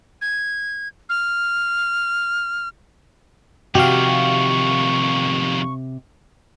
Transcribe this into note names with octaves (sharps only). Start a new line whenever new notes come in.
G#6
F6
F2 C3 D#3 F#4 G4 F5 C#6